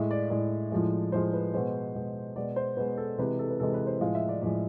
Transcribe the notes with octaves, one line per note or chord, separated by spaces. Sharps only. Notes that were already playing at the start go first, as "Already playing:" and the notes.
Already playing: A2 G#3 E5
D5
A2 G#3 D5
A2 F3 G#3
A2 F3 G#3 C5
B4
B2 G#3 C5
B2 G#3
B2 G#3 D5
C5
B2 G#3 B4
A4
C3 E3 G#3 B4
A4
B4
C3 E3 G#3 A4
B4
C5
A2 F3 G#3 F5
E5
D5
A2 F3 G#3 D5